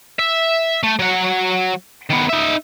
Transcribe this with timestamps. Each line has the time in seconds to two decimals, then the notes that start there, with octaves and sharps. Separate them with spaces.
0.19 E5
0.83 A3
0.99 F#3 F#5
2.10 D#3 B3
2.29 D#4 E5